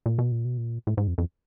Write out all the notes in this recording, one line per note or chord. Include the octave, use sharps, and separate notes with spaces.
A#2
B2
A#2
B2
A#2
A2
G#2
F2
F2